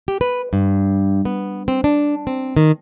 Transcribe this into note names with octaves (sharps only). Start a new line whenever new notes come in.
G4
B4
G2
B3
C4
D4
C4
D#3